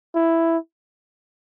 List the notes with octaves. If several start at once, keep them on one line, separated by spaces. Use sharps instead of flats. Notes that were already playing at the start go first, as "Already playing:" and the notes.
E4